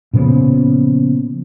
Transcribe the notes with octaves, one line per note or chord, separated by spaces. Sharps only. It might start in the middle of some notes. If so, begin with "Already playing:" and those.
A#2 C#3 F3 B3